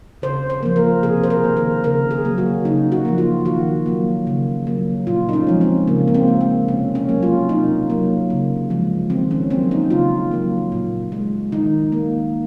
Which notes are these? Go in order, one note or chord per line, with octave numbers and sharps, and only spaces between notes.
C#3 C5
C5
F3 A#3
A#4
C3 G#4
C5
A#4
D#3 A#3
A#4
C#3 A#4
G#4
F#3 A#3
F#4
C#3 D#4
F#4
F3 A#3
F4
D#3 F#4
F#3 A#3
C#3
F#3 A#3
A#2 F4
D#4
C#4
F3 G#3
C4
C#3 A#3
A#3
C4
G#3
C4
C3 C#4
C#4
F#3 A#3
F4
C3 D#4
F#3 A#3
C#3
F3 G#3
D#3 C4
C#4
F#3 A#3 C4
D#4
C#3 F4
F#3 A#3
A#2
G#3
D#3 D#4
A#3